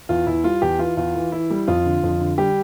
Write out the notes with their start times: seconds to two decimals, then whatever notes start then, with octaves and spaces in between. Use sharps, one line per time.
0.09 E2 F4
0.26 E2 E4
0.44 G3 F4
0.62 E2 G4
0.79 E3 F4
0.97 E2 F4
1.15 E3
1.32 E3 E4
1.50 G3
1.68 F2 F4
1.85 D3
2.03 F2
2.20 D3
2.38 G3 G4